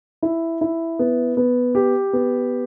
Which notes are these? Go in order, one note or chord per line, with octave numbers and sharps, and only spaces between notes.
E4
E4
B3
B3
G4
B3